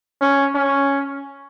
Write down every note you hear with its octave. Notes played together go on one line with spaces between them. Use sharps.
C#4
C#4